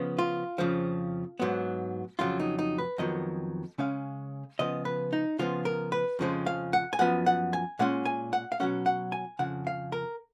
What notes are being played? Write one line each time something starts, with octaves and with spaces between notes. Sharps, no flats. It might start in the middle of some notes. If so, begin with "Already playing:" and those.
Already playing: C#3 F3 B3
F4
F2 C#3 F3
G#2 F#3 B3
F2 C#3 F#3 F4
D#4
D#4
B4
F2 D#3 F#3 B3 D#5
C#3 G#3 C#4 F5
C#3 F3 B3 D#5
B4
D#4
C#3 F3 B3 F4
A#4
B4
F2 C#3 F3 G#3
F5
F#5
G#5
F#2 F3 B3 F#5
F#5
G#5
A#2 G#3 C#4 F#5
G#5
F#5
F5
B2 F#3 C#4 F#5
F#5
G#5
F2 C#3 F#5
F5
A#4